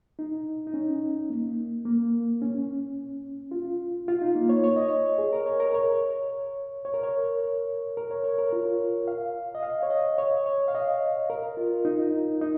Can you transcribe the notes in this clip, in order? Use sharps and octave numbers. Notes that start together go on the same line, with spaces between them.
D#4
D#4
C#4
A#3
A#3
C#4
F4
F4
D#4
A#3
C#5
C#5
D#5
C#5
G#4
A#4
C#5
A#4
C#5
C#5
A#4
C#5
A#4
C#5
C#5
A#4
F4
F5
D#5
F5
C#5
D#5
C#5
C#5
F5
D#5
A#4
F4
D#4
D#4